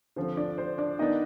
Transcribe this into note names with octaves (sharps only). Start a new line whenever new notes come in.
D3 F3 C4 C5
D4 D5
C5
D4 D5
D#3 B3 D4 D#4 D#5